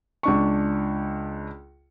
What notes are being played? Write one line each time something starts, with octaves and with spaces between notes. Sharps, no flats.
C#2 D4 C#6